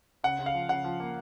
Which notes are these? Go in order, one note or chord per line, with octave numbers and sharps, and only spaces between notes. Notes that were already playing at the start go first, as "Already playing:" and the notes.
C#3 F#5
C#3
F5
F3
C#3 F#5
F3
A#3